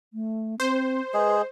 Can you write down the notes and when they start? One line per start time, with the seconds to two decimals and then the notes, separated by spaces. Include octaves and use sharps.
0.13 A3
0.60 C4 C5
1.14 G#3 G#4 B4